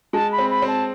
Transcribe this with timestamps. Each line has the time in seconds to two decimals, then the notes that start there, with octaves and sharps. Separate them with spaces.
0.13 G#3 A5
0.32 B5
0.38 C4
0.50 B5
0.62 C4
0.68 A5